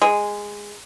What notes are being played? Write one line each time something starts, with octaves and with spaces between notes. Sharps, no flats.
G#3